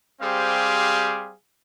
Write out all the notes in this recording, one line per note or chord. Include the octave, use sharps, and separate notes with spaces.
G3 C4 G4 G#4 C5 F5